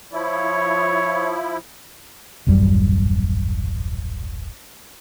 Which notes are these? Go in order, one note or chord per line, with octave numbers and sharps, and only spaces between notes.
F3 E4 C#5
D#1 A1 F#2 G3